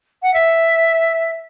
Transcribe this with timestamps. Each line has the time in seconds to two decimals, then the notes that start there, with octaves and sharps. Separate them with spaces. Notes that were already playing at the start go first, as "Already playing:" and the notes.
0.23 F#5
0.34 E5